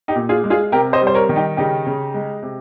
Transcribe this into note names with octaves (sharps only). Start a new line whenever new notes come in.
D#4 G4
A#2
F4 G#4
G#3
F4 G#4
C3 G4 A#4
C5 D#5
G3
C5
A#4 C#5
D#3
D#4 G4
C#3 D#4 G4
C#3
G#3
C3